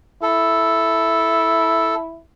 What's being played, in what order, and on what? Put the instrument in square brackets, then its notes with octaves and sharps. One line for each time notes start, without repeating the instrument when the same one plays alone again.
[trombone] E4 [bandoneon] A4